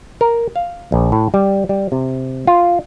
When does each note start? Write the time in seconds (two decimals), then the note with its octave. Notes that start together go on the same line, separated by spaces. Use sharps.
0.21 A#4
0.56 F5
0.92 A#1
1.12 A2
1.34 G3
1.69 G3
1.92 C3
2.47 F4